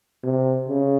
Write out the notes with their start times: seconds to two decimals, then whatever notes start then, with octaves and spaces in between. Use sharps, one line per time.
0.23 C3
0.69 C#3